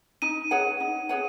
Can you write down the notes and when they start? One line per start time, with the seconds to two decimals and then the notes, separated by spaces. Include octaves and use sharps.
0.22 D#4 D#7
0.51 G#4 C#5 F#5
0.80 D#4
1.09 G#4 C#5 F#5